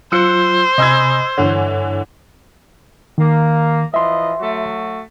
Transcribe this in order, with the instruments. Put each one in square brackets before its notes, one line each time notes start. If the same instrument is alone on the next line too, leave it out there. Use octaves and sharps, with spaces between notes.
[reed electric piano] F#3 F4 [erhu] C5 [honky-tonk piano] E6 F#6 C#7
[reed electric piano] C3 G#5 B5 [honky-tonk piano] D#5 E6 G#6
[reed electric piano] G2 C#5 [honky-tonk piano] D3 E3
[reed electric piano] D#3 [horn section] A#3
[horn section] E3 F3 D#5 [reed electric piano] E5 C6
[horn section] F#3 A3 F#4